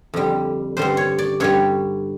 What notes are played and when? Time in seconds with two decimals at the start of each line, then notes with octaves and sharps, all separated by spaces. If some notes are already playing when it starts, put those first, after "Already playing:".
0.14 F2 D3 G3
0.77 G2 D3 G3 C5
0.97 C#5
1.18 D5
1.40 G2 D3 G3 C#5